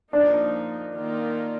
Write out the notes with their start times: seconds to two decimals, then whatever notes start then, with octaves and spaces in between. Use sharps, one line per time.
0.12 F3 A#3 D4 D#4
0.93 D#3 A#3 F4